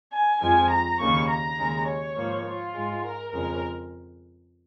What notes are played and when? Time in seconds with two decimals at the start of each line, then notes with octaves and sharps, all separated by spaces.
0.13 G#5
0.42 F2 F3 G#3 G#5
0.71 A#5
1.00 D#2 C#3 A#3 C#6
1.29 A#5
1.58 D#2 C#3 G#3
1.87 C#5
2.17 G#2 F3 A#3
2.46 F4
2.74 G#2 G#3
3.04 A#4
3.33 F2 C#3 G#3 A#4